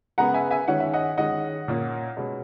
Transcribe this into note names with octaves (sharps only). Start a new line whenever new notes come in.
C#3 G#3 B3 F#5 A#5
E5 G#5
E5 G#5
D#3 G#3 C#4 F#5
E5
D#5 F#5
D#3 G#3 C#4 D#5 F#5
A#2 A#3 C#4
B2 G#3 C#4